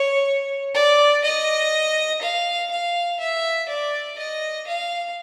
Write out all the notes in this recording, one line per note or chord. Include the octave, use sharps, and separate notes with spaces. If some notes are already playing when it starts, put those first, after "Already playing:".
Already playing: C#5
D5
D#5
F5
F5
E5
D5
D#5
F5